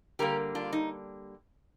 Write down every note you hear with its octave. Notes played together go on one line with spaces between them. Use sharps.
D3 G3 A#3 G4 A#4
D4 F4
D#4